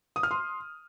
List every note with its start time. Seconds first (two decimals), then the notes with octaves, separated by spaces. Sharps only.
0.16 D#6
0.23 F6
0.31 C6